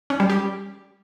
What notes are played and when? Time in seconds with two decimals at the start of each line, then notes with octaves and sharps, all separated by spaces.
0.10 C#4
0.20 G3
0.30 G4